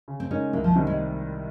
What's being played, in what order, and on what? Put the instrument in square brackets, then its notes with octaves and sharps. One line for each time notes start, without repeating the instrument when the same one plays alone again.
[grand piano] C#3
[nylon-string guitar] C4
[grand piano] G#3 D#4 A#4 [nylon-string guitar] C#4
[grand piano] C2 [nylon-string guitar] A#3
[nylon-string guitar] F3
[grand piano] C3 D#3 G3
[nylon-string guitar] G#3